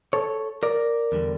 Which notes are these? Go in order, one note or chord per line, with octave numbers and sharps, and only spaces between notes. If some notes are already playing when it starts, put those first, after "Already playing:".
A4 C#5
A#4 D5
E2 D3 G3